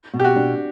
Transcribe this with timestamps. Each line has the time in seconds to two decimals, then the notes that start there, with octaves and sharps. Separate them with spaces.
0.14 B2
0.20 G4
0.24 F#4
0.36 D4